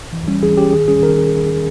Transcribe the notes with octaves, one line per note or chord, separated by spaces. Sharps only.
E3
G3 C#4
E3 G#4
G3 C#4 G4
D#3 G#4
G3 C#4 G#4
D#3 A#4